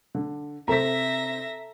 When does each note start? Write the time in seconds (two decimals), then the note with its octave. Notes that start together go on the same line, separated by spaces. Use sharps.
0.15 D3
0.68 C3 A4 C5 E5 A#5 A#6 B6